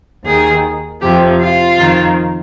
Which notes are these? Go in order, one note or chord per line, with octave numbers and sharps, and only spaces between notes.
D#2 D#3 G#4
F2 C3 F3 G4
F4
F2 D#3